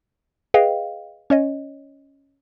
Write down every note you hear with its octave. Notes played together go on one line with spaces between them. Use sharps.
G#4 B4 D#5 F5 G5
C#4 C#5 D#5